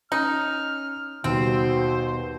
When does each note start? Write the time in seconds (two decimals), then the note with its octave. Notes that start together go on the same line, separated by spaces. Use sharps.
0.12 C#4 D#4 F6
1.24 D#2 B2 G3 C4 C5